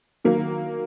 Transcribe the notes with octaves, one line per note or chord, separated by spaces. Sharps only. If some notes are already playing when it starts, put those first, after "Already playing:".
D#3 F#3 A#3